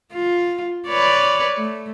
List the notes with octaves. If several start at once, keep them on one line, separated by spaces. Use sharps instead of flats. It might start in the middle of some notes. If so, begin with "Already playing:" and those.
F4
B4 C#5 D5
A3